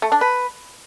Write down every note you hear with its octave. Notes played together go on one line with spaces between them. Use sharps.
A3
D4
B4